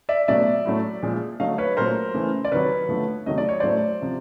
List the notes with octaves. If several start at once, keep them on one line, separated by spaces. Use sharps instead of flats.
D5 E5
B2 F#3 A3 D5 E5
A2 F#3 A3
A#2 F3 G#3
D3 F#3 A3 D#5 F5
B4 C#5
A#2 F#3 A3 A#4 C5
C#3 E3 A3
D5
C3 D#3 F#3 B4 C#5
D3 F3 A3
C3 D#3 F#3 A3 D#5
D5
C#5
A2 F#3 A3 C5 D5
C3 F3